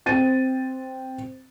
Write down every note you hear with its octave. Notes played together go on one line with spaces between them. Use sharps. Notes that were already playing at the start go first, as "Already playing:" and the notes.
C4 A6 D#7